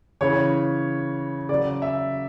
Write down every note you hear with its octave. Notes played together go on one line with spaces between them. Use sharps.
C#3 E3 C#5
C#3 F#3 D5
E5